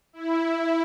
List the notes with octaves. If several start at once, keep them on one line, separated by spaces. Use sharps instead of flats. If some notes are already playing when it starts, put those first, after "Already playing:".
E4